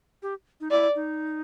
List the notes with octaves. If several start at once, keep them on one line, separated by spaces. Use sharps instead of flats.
G4
D#4
E4 D5
D#4